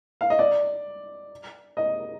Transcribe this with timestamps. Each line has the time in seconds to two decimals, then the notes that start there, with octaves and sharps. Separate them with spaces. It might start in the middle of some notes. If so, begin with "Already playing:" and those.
0.21 F5
0.30 D#5
0.39 D5
1.77 D#5